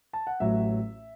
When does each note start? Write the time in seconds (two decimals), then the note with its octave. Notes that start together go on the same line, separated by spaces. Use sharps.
0.13 A5
0.27 F#5
0.40 A1 A2 F#3 E5